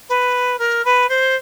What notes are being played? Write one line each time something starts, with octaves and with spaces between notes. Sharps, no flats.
B4
A#4
B4
C5